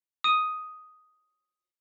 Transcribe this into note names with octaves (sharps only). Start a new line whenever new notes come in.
D#6 D#7